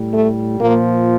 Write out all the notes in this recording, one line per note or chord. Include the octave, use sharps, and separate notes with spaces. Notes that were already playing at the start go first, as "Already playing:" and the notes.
Already playing: A2 G3
A3
A#2 F3 A#3